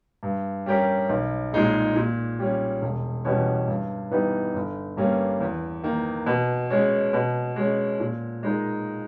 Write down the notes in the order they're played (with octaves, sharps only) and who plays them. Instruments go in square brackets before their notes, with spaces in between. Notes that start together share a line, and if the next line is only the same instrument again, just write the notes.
[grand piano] G2
G3 C#4 G4 A#4
B1
A#2 G#3 D#4 G#4
A#2
G3 C#4
E1
E2 B2 G3 C#4
G2
E3 G3 B3 D#4
G1
G2 G3 A#3 C#4
E2
D#3 A#3
B2
G#3 C#4
B2
G#3 C#4
A#2
G#3 D#4 A#4